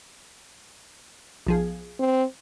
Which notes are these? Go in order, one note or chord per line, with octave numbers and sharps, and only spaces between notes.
B1 F3 G#4
C4